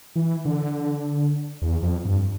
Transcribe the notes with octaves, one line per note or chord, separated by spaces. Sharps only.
E3
D3
E2
F2
G2